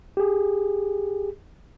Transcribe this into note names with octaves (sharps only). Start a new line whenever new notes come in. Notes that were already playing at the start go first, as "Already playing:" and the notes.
G4 G#4